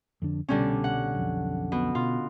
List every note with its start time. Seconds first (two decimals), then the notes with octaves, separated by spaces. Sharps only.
0.22 F2 D3 D4
0.48 C2 B2 D3 G3 C#4
0.84 F#5
1.15 B1 F2
1.72 B2
1.95 B2 F4